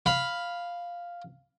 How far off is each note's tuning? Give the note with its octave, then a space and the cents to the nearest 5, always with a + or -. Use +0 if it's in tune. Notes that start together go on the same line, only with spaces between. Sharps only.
F5 +0 B5 +0